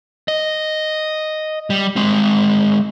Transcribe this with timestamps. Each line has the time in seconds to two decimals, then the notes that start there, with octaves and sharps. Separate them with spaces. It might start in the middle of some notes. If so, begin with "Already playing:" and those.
0.28 D#5
1.70 G3
1.96 G#3 C4